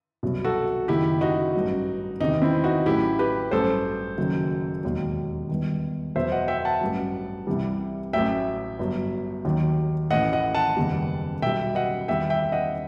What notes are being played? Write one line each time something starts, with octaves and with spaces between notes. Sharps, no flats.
C2 B2 F#3
F#4 A4
F#1 F#2 D#3 E4 G4
D#4 F#4
A1 G2 F#3
E2 C3 D#3 D#4
C4 E4
D#4 F#4
A1 A2 F#3 E4 G4
G4 B4
A1 G2 F#3 A4 C5
F#1 F#2 D#3 F#3
E1 D#2 D#3 F#3
G1 G2 D#3
E2 B2 F#3 C5 E5
D#5 F#5
E5 G5
F#5 A5
A1 G2 F#3
C2 C3 E3 G3
A1 A2 F#3 E5 G5
G1 G2 F#3
D#2 D#3 F#3
A1 A2 E3 D#5 F#5
D#5 F#5
F#5 A5
F#1 E2 D#3 G3
B1 B2 G3 E5 G5
D#5 F#5
E2 D#3 G3 E5 G5
E5 G5
D#5 F#5